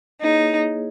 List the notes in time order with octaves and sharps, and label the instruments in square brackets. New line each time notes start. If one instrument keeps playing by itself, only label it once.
[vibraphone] A#3 E4 G#4 C#5 [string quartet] D#4